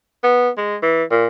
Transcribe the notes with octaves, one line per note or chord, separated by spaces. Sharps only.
B3
G#3
E3
A#2